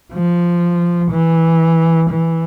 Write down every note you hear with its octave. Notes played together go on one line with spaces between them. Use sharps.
F3
E3
E3